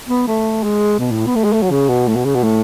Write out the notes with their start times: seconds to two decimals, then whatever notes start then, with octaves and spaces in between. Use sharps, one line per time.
0.09 B3
0.27 A3
0.64 G#3
0.99 B2
1.11 A2
1.27 B3
1.35 A3
1.44 G#3
1.53 A3
1.62 F#3
1.71 C#3
1.89 B2
2.08 A2
2.16 B2
2.25 C#3
2.35 B2
2.43 A2